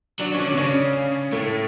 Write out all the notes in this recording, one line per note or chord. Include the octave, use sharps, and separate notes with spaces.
F#3 D4
C#4
D3 D4
B2
C#3 C#4
A2 A3